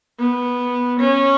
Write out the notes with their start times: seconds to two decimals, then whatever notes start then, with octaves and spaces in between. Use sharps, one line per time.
0.19 B3
1.00 C#4